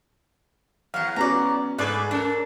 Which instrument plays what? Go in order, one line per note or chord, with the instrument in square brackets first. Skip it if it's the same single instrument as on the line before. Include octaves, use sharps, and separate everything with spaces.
[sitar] E2 F#3 [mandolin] F5 F#5
[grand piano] B3 C#4 F#4 [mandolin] D5 A#5
[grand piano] G#2 [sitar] A3 G#4 B4 [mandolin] D4 A4 D5
[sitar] C#4 [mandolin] D4 [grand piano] A4 A#4